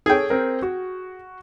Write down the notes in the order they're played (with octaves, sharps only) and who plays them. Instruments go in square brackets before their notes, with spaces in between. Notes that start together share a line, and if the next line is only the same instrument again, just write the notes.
[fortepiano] G#4 G5 [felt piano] A4 C#5
[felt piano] C4 A#4
F#4